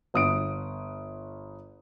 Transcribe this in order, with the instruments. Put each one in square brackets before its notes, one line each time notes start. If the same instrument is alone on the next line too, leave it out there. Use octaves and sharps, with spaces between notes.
[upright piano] G1 D#6 D7